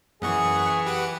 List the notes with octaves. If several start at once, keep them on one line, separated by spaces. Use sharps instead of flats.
F#2 E3 G#4 F#5 C#6
G4 B4 F#5